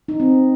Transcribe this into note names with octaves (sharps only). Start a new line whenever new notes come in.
D#4
C4